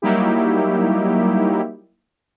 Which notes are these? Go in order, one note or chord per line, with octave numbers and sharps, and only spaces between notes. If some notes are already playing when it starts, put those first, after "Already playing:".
F#3 G3 A#3 D#4 E4 G4